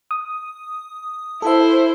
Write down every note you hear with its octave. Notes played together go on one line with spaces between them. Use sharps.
D#6
E4 A4 C5 E5